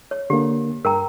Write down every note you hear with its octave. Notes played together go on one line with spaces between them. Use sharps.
C#5
D3 A#3 G4
G2 A#4 G5 A#5